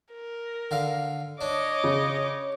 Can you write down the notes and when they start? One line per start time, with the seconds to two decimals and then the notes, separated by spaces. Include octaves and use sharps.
0.13 A#4
0.71 D3 F5
1.41 D4 C#5 D#5 D6
1.84 C#3